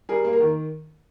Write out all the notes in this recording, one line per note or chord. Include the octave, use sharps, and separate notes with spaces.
G3 G#4 A#4
A#3
A#4
D#3